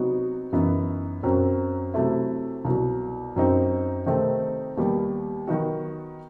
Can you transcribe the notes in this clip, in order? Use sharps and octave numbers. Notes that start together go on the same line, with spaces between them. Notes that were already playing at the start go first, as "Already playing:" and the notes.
Already playing: C3 F#3 B3 D#4 F#4
F#2 E3 B3 D#4
F#2 F#3 C4
C3 F#3 A3 E4
C2 B2 F#3
F#2 F#3 C4 D#4
C3 D#3 A3 C4 D#4
D#2 D#3 G3 B3
D#3 F#3 B3 D#4 F#4